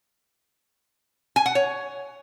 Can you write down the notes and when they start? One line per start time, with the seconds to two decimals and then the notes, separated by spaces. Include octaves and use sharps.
1.36 G#5
1.46 F#5
1.55 C#5